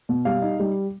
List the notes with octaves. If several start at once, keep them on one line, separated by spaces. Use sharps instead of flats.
B2
G3 F5
D#4
G3